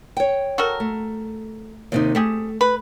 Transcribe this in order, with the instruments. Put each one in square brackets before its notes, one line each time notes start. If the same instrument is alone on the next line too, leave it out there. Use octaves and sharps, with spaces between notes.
[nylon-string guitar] C#5 G5
[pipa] F#4 A4 A#4
[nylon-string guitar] A3
D#2 C3 D#4
[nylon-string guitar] A3 [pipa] C4 G4 G#4
[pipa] B4